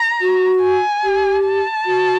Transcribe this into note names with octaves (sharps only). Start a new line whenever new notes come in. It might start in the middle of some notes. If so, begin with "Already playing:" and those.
Already playing: A#5
F#4
G#5
G4
A5
F#4